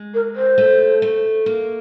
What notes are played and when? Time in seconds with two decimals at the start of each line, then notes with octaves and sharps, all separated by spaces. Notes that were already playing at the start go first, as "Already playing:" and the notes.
Already playing: G#3
0.14 A#4
0.35 C5
0.58 A3
1.02 A3
1.46 A#3